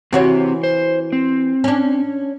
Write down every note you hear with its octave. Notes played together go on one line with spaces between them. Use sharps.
E3 C4 F#4 G4 C#5
C5
C4
C#4 D4